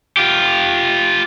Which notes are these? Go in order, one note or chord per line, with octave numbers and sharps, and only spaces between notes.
F4 G4